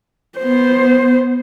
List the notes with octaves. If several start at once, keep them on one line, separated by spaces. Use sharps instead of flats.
B3 C5